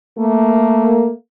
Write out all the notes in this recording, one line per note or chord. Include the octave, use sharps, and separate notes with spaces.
A3 A#3